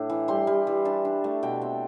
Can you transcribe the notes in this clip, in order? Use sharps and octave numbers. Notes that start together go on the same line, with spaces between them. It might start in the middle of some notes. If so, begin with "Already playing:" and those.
Already playing: A2 D4
E3
G3 C6
G3
E3
D4 A5
D4
A3
B2 G5
C4